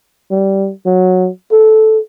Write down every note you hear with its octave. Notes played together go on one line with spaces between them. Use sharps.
G3
F#3
A4